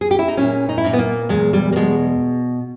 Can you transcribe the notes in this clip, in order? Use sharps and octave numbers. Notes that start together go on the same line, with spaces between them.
G#4
G4
E4
D#4
A#2 C#4
D#4
E4
A#2 D#4
B3
A#3
E2 G#3
G3
A#3
B2 G#3